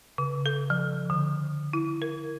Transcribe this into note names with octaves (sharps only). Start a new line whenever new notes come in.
C#3
A4
F3
D3
E4
A#4